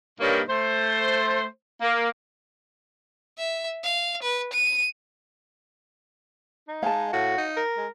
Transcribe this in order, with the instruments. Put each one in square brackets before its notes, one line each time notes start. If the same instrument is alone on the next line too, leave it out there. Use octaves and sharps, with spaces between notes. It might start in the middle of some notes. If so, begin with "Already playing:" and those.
[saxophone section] G2 A#2 D#3 A#3 C#5
A3 C5
A#3
[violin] E5
F5
B4
D#7
[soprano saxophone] D#4
[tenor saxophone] G#3 [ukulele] F5 A5
[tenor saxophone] A2 [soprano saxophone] F#4
[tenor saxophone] D#4
[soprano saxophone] A#4
[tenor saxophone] G#3